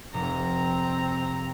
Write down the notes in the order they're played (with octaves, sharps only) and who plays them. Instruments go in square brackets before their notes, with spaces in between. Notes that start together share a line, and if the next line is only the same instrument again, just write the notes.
[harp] F1 [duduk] C4 [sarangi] A#5